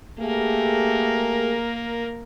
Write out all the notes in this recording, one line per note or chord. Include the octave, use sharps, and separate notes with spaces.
A3 A#3 G4 G#4 A#4